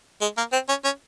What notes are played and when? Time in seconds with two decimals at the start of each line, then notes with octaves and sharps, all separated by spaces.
0.21 G#3
0.37 A#3
0.53 C4
0.69 C#4
0.84 C#4